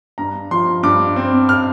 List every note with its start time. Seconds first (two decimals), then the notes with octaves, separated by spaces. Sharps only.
0.18 G2 A#5
0.51 F3 C6
0.83 G2 D6
1.16 C4
1.49 F6